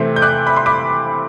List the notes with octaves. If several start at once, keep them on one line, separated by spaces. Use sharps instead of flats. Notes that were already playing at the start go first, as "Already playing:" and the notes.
Already playing: C3 E3 A3 C4 C6
G6
D6 F#6
B5
C6
B5 D6